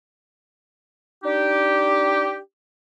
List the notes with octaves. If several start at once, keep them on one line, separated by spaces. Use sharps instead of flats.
D4 D#4 G4